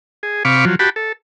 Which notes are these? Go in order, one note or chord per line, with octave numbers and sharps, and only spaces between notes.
G#4
C3 F5 B5 C#6 D6
F3 F#3
F#4 G4 A5 B5
A4